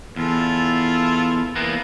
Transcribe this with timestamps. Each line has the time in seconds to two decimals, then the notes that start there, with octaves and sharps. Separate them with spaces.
0.16 E2 E4 F4 A4
1.55 E3 A#3 B3